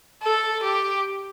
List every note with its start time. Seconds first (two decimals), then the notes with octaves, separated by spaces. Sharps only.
0.23 A4
0.63 G4